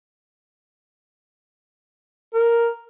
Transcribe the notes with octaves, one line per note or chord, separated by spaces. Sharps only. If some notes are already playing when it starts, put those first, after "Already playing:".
A#4